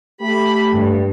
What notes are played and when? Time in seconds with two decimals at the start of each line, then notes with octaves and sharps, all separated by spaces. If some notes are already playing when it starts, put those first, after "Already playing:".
0.21 A3 G4 B5
0.73 G2